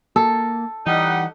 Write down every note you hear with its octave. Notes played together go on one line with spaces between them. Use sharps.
A#3 A4
E3 G3 D#4 F#5